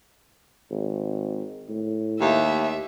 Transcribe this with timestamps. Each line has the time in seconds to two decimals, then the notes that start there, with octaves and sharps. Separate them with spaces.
0.71 G#1
1.69 A2
2.20 D#2 E5